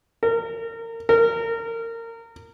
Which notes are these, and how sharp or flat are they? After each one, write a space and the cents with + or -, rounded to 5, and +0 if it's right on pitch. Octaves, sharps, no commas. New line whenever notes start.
A#4 -30
A#4 -25